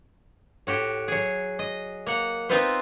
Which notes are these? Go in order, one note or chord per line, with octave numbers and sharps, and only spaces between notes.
A2 F#4 G4
F#3 G#4
D#5
A#3 F#5
B3 C4 D#4 F4 B4 C5